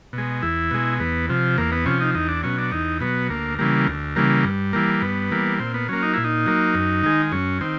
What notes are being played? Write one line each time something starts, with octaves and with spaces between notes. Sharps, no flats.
B2 G#3
E2 E4
B2 G#3
E2 B3
C3 F3
E2 A#3
B3
C3 F3 C#4
D#4
E2 D#4
D4
B2 F#3 C#4
D4
E2 D#4
B2 F#3 B3
D2 A#3
C#3 E3 G3 A#3
D2
C#3 E3 G3 A#3
G2
E3 G3 A#3
G2 B3
E3 G3 A#3
A#2 C4
B3
F#3 A#3 C#4
D#4
A#2 E4
D#4
F#3 A#3
F#2
D#3 G#3
F#2 C#4
D#3 C4